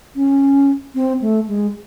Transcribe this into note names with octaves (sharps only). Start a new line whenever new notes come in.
C#4
C4
A3
G#3